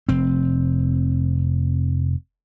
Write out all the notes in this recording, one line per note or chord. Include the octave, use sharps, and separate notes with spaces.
F1 C4